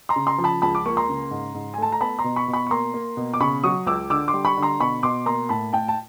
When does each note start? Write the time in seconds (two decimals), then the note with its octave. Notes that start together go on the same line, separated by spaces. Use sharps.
0.09 A#5 C6
0.16 C#3
0.27 A#5 C6
0.38 F3
0.44 A5 B5
0.62 C#2 A5 B5
0.75 D6
0.86 A#3 C#6
0.97 A#5 C6
1.09 C#3
1.31 G#2
1.54 G#2
1.74 G#5
1.78 A3 A5
1.92 A#5
2.01 B3 A5 B5
2.19 A#5 C6
2.24 B2
2.36 B5 C#6
2.48 B2
2.53 B5 C#6
2.67 C#6
2.71 A#3 A#5 C6
2.94 A#3
3.17 B2
3.34 D6
3.41 C#3 B5 C#6
3.64 F#3 C#6 D#6
3.87 C#2 D6 E6
4.10 D3 D6 E6
4.28 C6 D6
4.33 G3
4.45 B5 C#6
4.57 D3
4.63 A#5 C6
4.80 B2 B5 C#6
5.03 B2 C6 D6
5.26 A#3 A#5 C6
5.49 A2 A5 B5
5.73 A2 G5 A5
5.88 A5